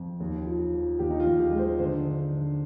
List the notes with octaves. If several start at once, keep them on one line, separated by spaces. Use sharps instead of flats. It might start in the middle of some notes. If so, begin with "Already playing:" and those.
Already playing: F2
D#2
F3
F3
D#2 G4
D#4
F4
D#2
G4
G#3
C5
D3 C5
D3
D3